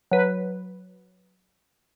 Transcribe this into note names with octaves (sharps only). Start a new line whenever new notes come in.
F#3 B4